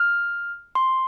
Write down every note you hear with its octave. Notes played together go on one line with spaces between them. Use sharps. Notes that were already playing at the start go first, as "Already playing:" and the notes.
Already playing: F6
C6